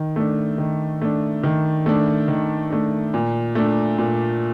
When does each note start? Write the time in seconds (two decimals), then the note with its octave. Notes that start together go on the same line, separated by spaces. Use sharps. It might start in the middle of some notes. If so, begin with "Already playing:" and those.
Already playing: D#3
0.16 A3 D4
0.58 D#3
1.02 A3 D4
1.43 D#3
1.86 A3 D4
2.28 D#3
2.70 A3 D4
3.14 A#2
3.55 A3 D4
3.99 A#2